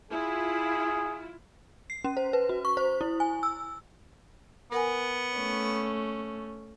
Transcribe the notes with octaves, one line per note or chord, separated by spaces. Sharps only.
E4 F4 G#4
C7
C#4
C5
B4
F#4
C#6
C5
E4
G#5
E6
B3 A#4 F#5 G#5
A3 C#4